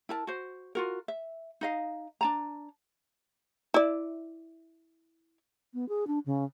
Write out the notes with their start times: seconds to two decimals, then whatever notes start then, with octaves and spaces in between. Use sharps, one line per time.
0.09 E4 A#4 A5
0.27 F#4 C5
0.75 F4 F#4 A#4
1.08 E5
1.61 D#4 D#5 F5
2.21 D4 A5 A#5
3.74 E4 D5
5.74 B3
5.89 G#4
6.07 D4
6.26 C#3